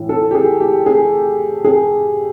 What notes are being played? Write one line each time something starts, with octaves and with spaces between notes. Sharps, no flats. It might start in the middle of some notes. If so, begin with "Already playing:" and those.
Already playing: A2 E3
A4
G4
G#4
G4
G#4
G#4